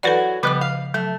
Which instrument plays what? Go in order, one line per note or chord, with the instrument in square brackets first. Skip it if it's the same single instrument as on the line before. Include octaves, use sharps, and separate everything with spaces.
[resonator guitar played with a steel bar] E3 F#3 F#4 [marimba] A4 B4 D5
[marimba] C#3 F3 D6 [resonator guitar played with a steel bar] G3 B3
[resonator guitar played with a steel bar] F5
[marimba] F#3 [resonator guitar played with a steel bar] A3